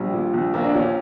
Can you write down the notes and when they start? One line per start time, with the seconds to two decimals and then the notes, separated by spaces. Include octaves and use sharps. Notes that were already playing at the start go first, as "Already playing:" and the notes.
Already playing: A#1 G3
0.14 A#2
0.34 A#1
0.54 A#1 A#3
0.65 D4
0.74 A#2 C#4